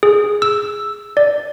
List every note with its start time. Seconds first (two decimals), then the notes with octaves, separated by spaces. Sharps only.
0.03 G#4
0.42 E6
1.17 D5